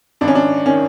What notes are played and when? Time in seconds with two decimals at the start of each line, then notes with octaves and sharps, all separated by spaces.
0.21 G#1 D4
0.28 C#4
0.35 D4
0.66 D#3 C#4